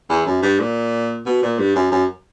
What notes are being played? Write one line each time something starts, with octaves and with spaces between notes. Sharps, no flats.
E2
F#2
G2
A#2
B2
A#2
G2
F#2
F#2